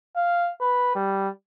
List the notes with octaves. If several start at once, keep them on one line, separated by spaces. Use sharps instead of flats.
F5
B4
G3